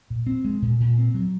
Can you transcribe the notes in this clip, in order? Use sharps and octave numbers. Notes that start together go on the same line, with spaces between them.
A#2
C4
G#3
A#2
A#2
C4
F#3